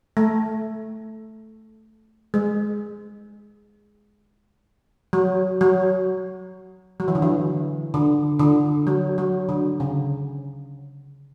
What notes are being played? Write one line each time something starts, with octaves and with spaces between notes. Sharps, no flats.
A3
G#3
F#3
F#3
F#3
E3
D3
E3
D3
D3
F#3
F#3
D3
C#3